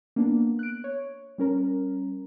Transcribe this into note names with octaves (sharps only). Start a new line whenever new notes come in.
A#3 B3 D4
F#6 D7
C#5
G3 C#4 A#4 A#5